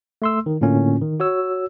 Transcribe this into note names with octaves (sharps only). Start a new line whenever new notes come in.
A3 C6 E6
D#3
A2 D3 A#3 C#4 F4
D#3
F#4 C#5 E6